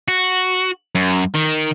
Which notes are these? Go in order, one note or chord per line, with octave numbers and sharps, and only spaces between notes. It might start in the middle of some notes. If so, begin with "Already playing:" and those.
F#4
F#2
D#3